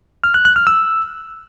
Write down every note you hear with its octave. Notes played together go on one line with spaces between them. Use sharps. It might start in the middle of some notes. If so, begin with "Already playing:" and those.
F6
F#6
F#6
F6
E6